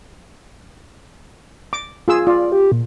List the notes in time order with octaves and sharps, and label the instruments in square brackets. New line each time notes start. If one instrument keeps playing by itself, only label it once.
[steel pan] D6
F4 G#4 E6
[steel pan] F4 [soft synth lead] D5
[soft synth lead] G4
A#2